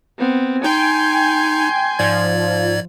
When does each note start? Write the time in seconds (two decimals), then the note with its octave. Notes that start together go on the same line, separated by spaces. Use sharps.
0.18 B3 C4
0.64 D#4 G5 G#5 C6 G6
1.99 G#2 F3 D5 G#6